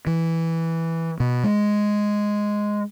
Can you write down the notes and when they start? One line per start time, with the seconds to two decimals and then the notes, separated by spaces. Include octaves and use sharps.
0.07 E3
1.20 B2
1.44 G#3